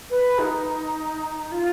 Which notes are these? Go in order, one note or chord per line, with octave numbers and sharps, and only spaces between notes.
B4
D#4
F4